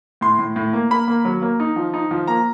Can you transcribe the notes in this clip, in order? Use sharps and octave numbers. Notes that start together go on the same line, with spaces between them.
A2 C6
A2
A2
A#3
A#3 B5
A#3
F#3
A#3
D#4
F3
D#4
F3
A#3 A#5